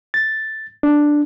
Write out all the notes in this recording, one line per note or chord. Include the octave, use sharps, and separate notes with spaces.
A6
D4